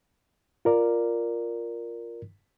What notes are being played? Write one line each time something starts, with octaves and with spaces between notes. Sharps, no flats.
F4 A#4 D5